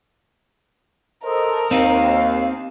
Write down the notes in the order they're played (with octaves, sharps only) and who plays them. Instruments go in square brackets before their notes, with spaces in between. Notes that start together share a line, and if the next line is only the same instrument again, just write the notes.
[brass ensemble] A4 C5 D#5 [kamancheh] A#4
[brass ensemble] D#2 [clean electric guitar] C4 D#4 [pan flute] F5